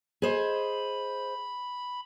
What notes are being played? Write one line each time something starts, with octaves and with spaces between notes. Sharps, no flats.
G#4 C5 D#5 B5